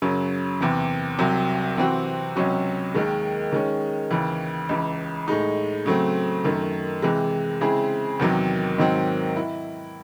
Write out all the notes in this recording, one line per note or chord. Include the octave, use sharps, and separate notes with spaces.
F#2 C#3 F#3 C#4
E2 C3 E3
C2 C3 F#3
C3 E3 C4 F#4
C#2 C3 F#3 C#4 F#4
D#2 D#3 G#3
D#3 G#3 C#4
D#2 C#3 E3
C#2 C#3 E3
A2 G#3 D#4
C#3 F#3 A3 C4
F#2 D#3 A3
C3 E3 G#3
C#3 G#3 C4 E4 G#4
E2 C3 D#3 F#3
G#2 D#3 F#3 C4
E4